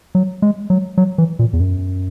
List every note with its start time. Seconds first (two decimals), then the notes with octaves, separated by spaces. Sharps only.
0.15 F#3
0.42 G#3
0.70 F#3
0.98 F#3
1.18 E3
1.39 A#2
1.53 E2
1.60 F#2